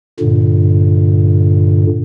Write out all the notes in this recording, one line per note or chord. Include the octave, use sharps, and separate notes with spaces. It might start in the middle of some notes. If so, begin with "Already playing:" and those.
G2 A#2 D3